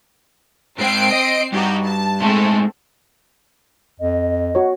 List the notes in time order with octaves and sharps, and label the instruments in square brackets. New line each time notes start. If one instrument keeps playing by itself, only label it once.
[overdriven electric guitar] G#2 G5 [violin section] C4 C7 D7
[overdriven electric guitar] D#5
[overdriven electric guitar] G2 [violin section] D#4 F#4 G4
[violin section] A5
[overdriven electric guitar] A2 G#3 [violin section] A3 C4
[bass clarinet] F2 [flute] D#5
[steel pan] F#4 C#5